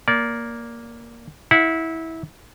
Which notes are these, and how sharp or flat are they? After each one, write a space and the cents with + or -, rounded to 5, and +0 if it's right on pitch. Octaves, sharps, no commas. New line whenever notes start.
A#3 +5 D5 -25
E4 -20 F#5 -25